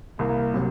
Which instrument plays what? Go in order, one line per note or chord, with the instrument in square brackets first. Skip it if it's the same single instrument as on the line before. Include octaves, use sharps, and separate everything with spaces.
[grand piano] C2 [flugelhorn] A#3
[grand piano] C3 F#3